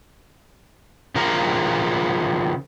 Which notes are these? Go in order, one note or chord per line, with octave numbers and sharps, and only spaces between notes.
C#3 F3 A#4